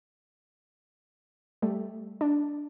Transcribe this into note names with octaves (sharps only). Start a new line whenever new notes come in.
G3 A3
D4